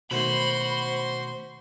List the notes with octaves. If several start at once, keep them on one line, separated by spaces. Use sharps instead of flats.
B2 D#3 A3 F#4 C5 B5 C6